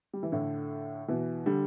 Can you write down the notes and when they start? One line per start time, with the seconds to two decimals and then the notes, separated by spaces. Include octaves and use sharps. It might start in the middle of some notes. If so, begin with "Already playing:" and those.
0.13 G3
0.23 E3
0.32 A2 D3
1.08 B2 E3
1.46 D3 G3